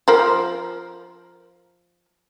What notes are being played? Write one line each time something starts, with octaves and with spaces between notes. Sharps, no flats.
F3 A#4